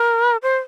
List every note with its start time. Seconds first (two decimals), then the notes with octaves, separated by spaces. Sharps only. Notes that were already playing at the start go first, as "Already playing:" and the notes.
Already playing: A#4
0.43 C5